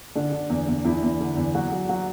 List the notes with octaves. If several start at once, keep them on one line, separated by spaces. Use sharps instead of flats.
D3 D4
D3
E2
E2
E2 E4
E2
D3
E2
F#3 F#4
F#3
F#3 F#4